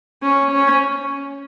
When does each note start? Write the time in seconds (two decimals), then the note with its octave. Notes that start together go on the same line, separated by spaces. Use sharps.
0.23 C#4
0.51 C#4